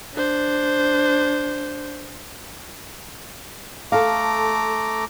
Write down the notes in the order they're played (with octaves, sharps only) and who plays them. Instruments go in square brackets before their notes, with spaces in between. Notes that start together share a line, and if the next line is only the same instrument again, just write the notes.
[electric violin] D4 C5
[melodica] A3 A#5 D6 [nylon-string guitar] A4 F5